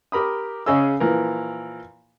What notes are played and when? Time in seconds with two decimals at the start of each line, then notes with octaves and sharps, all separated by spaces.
0.12 G4 A#4 B5 D#6
0.66 C#3 C#4 G#4 D#5 E6
1.00 A#2 E3 F3 A#4